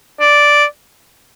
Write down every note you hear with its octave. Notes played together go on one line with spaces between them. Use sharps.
D5